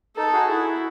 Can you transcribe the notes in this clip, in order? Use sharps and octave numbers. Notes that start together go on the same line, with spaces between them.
D#4 A4
F#4 G#4
E4 F#4 G#4